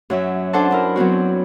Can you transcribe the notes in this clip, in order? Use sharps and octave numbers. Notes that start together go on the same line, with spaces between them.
F#2 F#3 E5
C#4 D4 A4 C5 F#5 A5
D4 E4 A#4
F#3 B3 C4 F#4